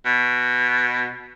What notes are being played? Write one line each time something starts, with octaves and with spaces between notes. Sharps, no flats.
B2